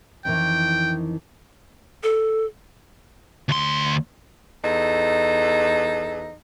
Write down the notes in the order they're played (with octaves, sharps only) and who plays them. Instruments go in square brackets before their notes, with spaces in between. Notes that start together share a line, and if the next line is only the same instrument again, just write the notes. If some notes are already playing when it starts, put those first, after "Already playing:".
[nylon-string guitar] F2 D#3 E3 [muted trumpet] G5
[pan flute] A4
[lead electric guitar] D2 C6
[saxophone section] E2 D#4 A4